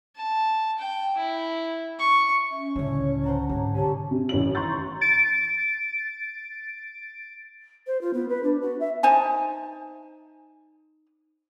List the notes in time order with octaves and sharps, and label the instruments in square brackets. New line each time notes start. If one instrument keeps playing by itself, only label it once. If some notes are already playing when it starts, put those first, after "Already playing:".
[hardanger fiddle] A5
G5
E4
C#6
[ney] C#4 [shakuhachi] E5
[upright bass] C#2 A2 [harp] D3 [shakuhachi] C#5
[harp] C5 F#5 A5 [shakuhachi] A#5
[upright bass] G#2 [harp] C3 [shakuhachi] C#5
[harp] D3 A#3 C#4 [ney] G4 [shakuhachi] A5
[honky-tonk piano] C3
A1 D#3 C#4 F#7
A#5 C6 C#6 G6 A6
[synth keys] A6 D7
[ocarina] C5
F4
B3
B4
D4
F#4
E5
[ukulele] D#4 C5 G#5 A5